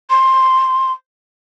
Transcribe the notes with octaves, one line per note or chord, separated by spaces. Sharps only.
C6